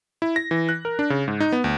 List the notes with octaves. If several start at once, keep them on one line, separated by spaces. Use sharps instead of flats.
E4
A#6
E3
F#6
A#4
D4
C#3
G#2
D#4
B3
D2